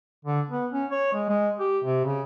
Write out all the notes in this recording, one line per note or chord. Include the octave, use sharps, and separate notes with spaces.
D3
B3
C#4
C#5
G#3
G#3
G4
C3
C#3